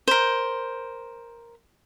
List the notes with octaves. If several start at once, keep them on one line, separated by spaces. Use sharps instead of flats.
A#4 C5